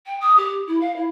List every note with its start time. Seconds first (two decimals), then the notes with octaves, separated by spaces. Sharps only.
0.06 G5
0.21 D#6
0.37 G4
0.67 E4
0.81 F5
0.96 E4